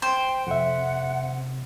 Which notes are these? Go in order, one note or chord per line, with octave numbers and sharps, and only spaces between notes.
C5 G5
F2 C3 E5 F#5